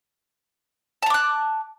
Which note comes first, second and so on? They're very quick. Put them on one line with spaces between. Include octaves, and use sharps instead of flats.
A5 A#5 D6 F#6